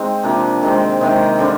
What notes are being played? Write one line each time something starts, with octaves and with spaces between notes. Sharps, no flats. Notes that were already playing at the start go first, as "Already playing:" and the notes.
Already playing: G#3 C4 D#4
C3 F3 A#3 D4
D#3 G#3 C4
C3 D#3 G#3 C4 D#4
D3 G3 C4